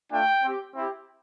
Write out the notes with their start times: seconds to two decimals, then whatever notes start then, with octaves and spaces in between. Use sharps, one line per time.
0.12 A3 D4 F4 G5
0.43 C4 G4
0.74 C4 E4 G4